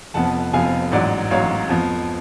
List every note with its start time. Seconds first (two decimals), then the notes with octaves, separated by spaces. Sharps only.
0.14 F1 F2 F3 B3 F#5 A5
0.53 F1 F2 F3 B3 F5 G#5
0.92 A1 G#2 F#3 D5 F#5
1.31 A1 G#2 F#3 C#5 F5
1.69 F2 F3 B3